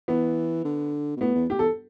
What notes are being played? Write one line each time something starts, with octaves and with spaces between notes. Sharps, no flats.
E3 B3
D3
B2
A2 B3
E2
A2 G4
E2 A4